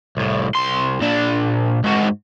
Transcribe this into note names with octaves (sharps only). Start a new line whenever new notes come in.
C2 A2
C2 C6
A#2 D4
G#2 F#4